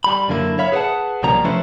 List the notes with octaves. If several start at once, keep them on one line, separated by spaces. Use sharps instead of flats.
G3 B5
F#2 D3 F#3 A#3 E4
C#5 E5 F5 B5
G#4 B4 C5 F5 F#5 A5
B1 C#3 F3 G3 A#3 A#5
F3 A3 C#4 E4 B4 C5